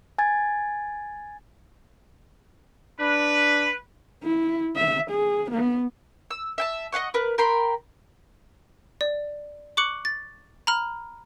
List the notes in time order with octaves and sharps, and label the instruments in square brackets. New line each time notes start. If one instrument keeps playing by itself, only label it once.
[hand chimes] G#5 G#6 A6
[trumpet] D4 [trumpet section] B4
[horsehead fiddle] E4
E5
G#4
B3
[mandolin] E6
E5 G5 A5
D#5 F5 F#5 C#6
A#4 B4
A#4 G5 B5 C6
[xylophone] D5
C#6 D6 F#6 C#7 F#7
A6
A#5 B5 F6